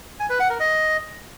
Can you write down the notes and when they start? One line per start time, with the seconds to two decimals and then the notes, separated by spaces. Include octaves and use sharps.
0.20 G#5
0.30 B4
0.40 F#5
0.50 A#4
0.60 D#5